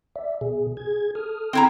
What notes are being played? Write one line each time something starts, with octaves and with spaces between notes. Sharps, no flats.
D5 E5
B2 G#4
G#4 G#6
A4 D#6 F6
C4 E4 A#5